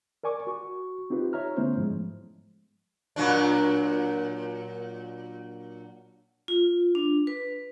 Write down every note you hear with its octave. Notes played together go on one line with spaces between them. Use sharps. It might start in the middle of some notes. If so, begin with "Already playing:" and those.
A#4 D5 G#5 C#6 D6
F#4 C#6
C4 D#4 F4 G4 B4
C#5 E5 A#5 F6
D3 A3 B3 C#4 E4 C5
G#2 F3 G#3
A#2 F#3 D4
F4
D4
B4